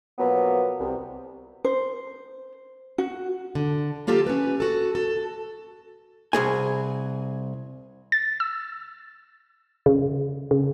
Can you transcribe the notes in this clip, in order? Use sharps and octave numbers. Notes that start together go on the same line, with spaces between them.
B2 F3 F#3 A#3 B3
C2
C5
F#4
D3
F3 A#3 F4 G4 A4
C#4 B4
F#4 A4
A4
C2 G#4 G#5
A6
E6
C#3
C#3